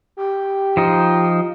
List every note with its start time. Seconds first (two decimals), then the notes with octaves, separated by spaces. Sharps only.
0.17 G4
0.77 F3 D#4